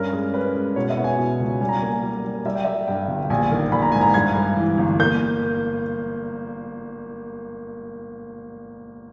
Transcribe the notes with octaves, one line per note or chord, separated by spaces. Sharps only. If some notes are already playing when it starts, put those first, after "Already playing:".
Already playing: G2 C#4 A#4
G#3
C#4 B4
G#3
B2 C#5
E5
B3
G#5
B2
C#2
G3 G#5
A#5
A#3 G#5
G3
G3
G3 E5
G5
G3 E5
G2 G5
G1
A#1 G#5
D#3
A#1 B5
A#5
G#2 G#5
A#5
G2 G#6
G2
E3
G1
A#3 G6